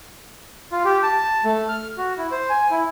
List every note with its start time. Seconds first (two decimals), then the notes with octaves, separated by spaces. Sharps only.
0.72 F4
0.85 G4
1.03 A5
1.45 A3
1.69 F6
1.97 F#4
2.18 E4
2.31 C5
2.50 G#5
2.71 E4